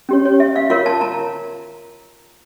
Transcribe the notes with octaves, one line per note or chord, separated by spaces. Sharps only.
C#4 G4 C#5
C#5
E5
F5
F4 A#4 C#5 F5
A5
A#5